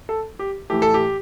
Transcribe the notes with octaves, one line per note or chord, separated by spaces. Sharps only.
A4
G4
A2 E3 A3 G4
A4
G4